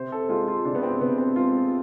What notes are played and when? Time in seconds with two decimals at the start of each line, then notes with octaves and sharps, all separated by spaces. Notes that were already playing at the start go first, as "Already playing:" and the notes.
Already playing: C3 C5
0.12 A4
0.29 G#3 F4
0.48 F4
0.65 C3 D4
0.75 B3
0.83 C4
1.01 C3 B3
1.18 C4
1.36 G#3 F4